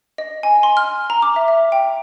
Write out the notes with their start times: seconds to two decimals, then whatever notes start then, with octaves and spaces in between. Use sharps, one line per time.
0.18 D#5
0.43 G#5
0.63 C6
0.77 F6
1.10 A#5
1.22 D6
1.36 E5
1.48 E5
1.72 G5